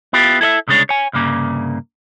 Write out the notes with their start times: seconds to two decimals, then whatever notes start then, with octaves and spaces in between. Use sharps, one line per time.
0.13 B3 E4 F4 G4
0.41 E4 A4 D#5 E5
0.68 C2 C#3 G#3 D4 C#5
0.89 C#5 G#5
1.13 C2 G2 C#3 A#3